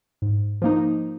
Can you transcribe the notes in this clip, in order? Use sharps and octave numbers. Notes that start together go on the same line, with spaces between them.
G#2
F3 A#3 D#4